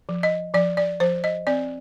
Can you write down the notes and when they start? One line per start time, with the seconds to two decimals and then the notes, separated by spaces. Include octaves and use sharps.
0.09 F3
0.23 D#5
0.54 F3 D5
0.77 D5
1.00 F3 C5
1.24 D#5
1.47 C4 D5